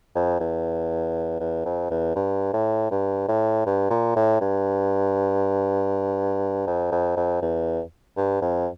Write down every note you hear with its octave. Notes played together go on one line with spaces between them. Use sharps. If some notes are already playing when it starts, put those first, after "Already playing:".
F2
E2
E2
F2
E2
G2
A2
G2
A2
G2
A#2
A2
G2
F2
F2
F2
E2
G2
F2